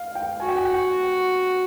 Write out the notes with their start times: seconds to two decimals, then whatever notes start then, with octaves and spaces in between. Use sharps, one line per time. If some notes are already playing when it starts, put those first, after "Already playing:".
Already playing: F5
0.15 G5
0.40 F#4 G#5
0.48 G5
0.56 F#5
0.65 G5